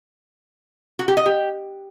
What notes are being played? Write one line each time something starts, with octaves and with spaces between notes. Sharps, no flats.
F#4
G4
D#5
G4